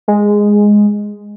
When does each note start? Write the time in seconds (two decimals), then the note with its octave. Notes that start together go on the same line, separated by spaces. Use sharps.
0.08 G#3